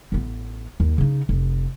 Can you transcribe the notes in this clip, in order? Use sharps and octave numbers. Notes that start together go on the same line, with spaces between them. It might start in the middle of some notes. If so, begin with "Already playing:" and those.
A1 B3
D#2
C#3 D#4
F1